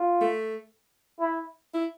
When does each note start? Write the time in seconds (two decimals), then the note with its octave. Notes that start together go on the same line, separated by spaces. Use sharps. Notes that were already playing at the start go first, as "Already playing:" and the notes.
Already playing: F4
0.21 A3
1.20 E4
1.74 E4